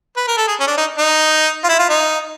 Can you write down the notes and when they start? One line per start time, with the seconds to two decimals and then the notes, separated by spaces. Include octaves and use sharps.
0.17 B4
0.28 A#4
0.37 A4
0.48 G#4
0.60 C#4
0.67 D4
0.78 D#4
0.98 D#4
1.64 F4
1.69 E4
1.79 F4
1.89 D#4